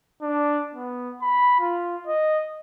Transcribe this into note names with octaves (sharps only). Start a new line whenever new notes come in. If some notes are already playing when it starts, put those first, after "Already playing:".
D4
B3
B5
F4
D#5